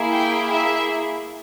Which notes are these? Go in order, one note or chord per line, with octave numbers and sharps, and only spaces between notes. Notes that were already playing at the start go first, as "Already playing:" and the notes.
Already playing: A#3 E4 G#4
G5
E5